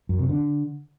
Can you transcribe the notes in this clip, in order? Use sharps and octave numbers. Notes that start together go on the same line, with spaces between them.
F#2
C3
D3